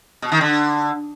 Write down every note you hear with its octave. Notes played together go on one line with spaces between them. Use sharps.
B2
D#3
D3